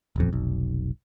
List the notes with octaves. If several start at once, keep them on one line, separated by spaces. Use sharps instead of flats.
D#1 A1 F2
F1 B1